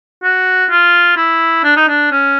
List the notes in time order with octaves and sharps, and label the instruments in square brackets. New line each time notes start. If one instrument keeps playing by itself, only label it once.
[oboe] F#4
F4
E4
D4
D#4
D4
C#4